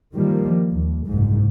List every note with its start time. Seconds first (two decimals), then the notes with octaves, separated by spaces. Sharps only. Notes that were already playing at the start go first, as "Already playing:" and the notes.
0.14 D#3 F3 G3 A#3
0.70 D#2
1.06 F#1 C2 G#2